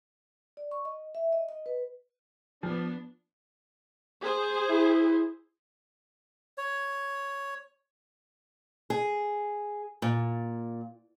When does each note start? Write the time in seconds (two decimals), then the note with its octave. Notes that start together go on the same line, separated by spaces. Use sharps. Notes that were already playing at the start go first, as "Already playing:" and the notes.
0.57 D5
0.71 C#6
0.85 D#5
1.15 E5
1.32 D#5
1.49 D#5
1.66 B4
2.63 F3 B3 D4
4.22 G#4 C5
4.69 E4
6.58 C#5
8.90 G#4
10.02 A#2